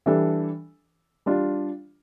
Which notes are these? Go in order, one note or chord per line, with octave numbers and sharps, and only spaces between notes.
E3 G3 D4 A4
G3 D4 F4